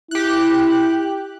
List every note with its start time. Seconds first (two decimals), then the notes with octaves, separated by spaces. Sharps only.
0.11 E4 G4 F#6